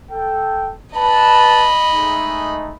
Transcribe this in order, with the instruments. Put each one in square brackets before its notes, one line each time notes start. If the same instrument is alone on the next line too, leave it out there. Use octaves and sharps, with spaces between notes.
[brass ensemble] A4 G5
[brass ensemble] B4 A5 [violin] D#5 B5
[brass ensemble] G#3 A3 D#4